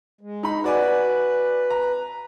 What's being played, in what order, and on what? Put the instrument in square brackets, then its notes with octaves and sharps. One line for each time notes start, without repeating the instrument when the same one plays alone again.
[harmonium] G#3
[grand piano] D#4 B5
[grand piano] F#4 D5 G#5 [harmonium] B4
[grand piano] A#5